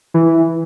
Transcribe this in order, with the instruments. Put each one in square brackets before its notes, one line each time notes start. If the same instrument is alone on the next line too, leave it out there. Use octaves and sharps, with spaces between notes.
[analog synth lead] E3